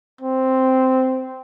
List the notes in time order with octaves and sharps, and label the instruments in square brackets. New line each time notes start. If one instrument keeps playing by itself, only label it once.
[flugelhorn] C4